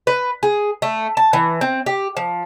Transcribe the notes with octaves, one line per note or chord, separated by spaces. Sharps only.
B4
G#4
A3
A5
E3
C4
G4
F3